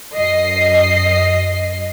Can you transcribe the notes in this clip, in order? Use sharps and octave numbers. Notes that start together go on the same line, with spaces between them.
F#2 D#5 C7